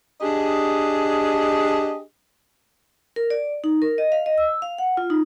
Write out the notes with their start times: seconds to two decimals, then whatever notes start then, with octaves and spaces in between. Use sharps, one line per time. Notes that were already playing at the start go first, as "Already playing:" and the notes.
0.21 D4 G4 G#4 D#5
3.16 A#4
3.30 D5
3.64 D#4
3.82 A#4
3.98 D#5
4.12 F5
4.26 D#5
4.38 E6
4.62 F5
4.78 F#5
4.97 F4
5.10 D#4